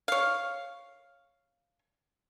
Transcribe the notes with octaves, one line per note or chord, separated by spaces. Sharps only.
C#5 F5